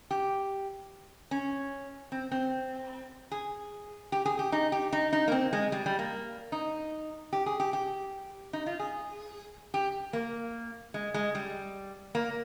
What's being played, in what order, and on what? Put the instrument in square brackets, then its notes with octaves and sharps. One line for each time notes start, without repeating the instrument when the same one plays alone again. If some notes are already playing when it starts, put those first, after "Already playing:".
[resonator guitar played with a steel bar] G4
C#4
C4
C4
G#4
G4
G#4
G4
D#4
G4
D#4
D#4
A#3
C4
G#3
G3
G3
A#3
D#4
G4
G#4
G4
G4
D#4
F4
G#4
G4
A#3
G#3
G#3
G3
A#3